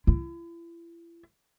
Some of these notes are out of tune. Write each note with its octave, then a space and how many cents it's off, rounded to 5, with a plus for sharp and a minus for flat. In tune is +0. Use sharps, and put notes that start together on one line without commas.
E4 +40